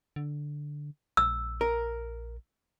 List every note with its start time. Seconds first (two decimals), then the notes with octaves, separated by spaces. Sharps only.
0.16 D3
1.17 A#1 E6
1.61 A#4